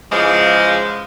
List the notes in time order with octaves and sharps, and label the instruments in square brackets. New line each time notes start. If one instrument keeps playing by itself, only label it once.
[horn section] G#2 C#3 E3 F3 G#3